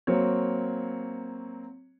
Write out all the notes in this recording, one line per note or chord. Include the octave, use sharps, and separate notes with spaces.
F#3 A#3 C4 C#5